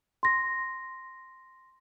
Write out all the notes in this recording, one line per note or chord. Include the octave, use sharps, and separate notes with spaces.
C6 A#6